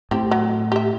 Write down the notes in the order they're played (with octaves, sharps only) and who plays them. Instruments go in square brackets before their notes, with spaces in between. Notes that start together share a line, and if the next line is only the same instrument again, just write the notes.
[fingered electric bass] A2 [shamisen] C4 G4
[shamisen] F#3
G4 E5